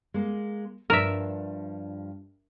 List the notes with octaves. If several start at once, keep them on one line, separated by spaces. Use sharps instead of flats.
G#3 A#3
G2 F3 D4 A#4 E5